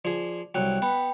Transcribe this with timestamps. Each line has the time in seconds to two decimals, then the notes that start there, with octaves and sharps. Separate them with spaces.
0.05 F3 G#4 D5
0.55 C2 F#3 G5 F#6
0.82 B3 G5 B5